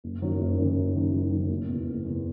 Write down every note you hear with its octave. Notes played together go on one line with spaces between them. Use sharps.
F#1
F#2 D#3 F#3
F#1
F#2 D#3 F#3
F#1
F#2 D#3 F#3
F#1
F#2 D#3 F#3
F#1
E2 B2
F#1
E2 B2